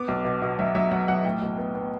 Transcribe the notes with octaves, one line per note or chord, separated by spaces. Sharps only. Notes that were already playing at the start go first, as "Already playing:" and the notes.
Already playing: B3 D6
B1
B2
B2
F#3 E5
F#3 E5
F#3 F#5
B1 F#5
A2 G5
B1
B3
B3